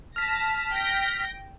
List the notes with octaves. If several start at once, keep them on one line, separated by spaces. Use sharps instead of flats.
A5 F6 A#6 B6
G5 G6 A#6